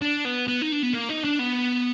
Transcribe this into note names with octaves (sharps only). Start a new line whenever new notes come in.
D4
B3
B3
D#4
D4
B3
A#3
D#4
D4
B3